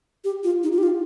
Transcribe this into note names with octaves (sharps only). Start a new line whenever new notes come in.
G4
F4
D#4
F4
G4
F4